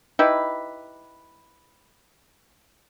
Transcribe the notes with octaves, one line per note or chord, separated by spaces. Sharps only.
D#4 E4 G4 B4